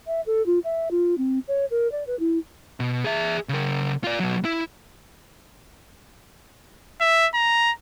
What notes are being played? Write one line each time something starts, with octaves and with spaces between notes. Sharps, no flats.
E5
A4
F4
E5
F4
C4
C#5
A#4
D5
B4
E4
B2
G#4 E5
C#3 A#4
F4 D5
B2 F#3
E4
E5
A#5